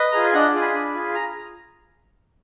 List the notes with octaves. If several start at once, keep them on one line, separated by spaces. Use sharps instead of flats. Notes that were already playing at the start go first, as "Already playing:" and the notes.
Already playing: B4 D#5
F4 G#4 A#5
G#5
D4 D#5 F#5
F4 G#4
G#5 B5
D4
F4 G#4
A#5